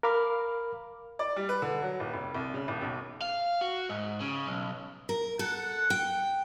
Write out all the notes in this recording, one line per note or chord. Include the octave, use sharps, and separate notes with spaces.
A#4 F5 B5 D6 F6
D5
G3
B4
D3
F#3
D#1
F1
C2
C#3
D#1
B1
F5
F#4
G#2
C#3
B1
A#4
A4 F#5
G5